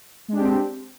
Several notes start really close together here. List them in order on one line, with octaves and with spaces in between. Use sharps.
G#3 D4 G4 C4